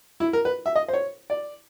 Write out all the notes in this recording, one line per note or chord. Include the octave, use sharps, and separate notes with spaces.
E4
A#4
B4
E5
D#5
C5
C#5
D5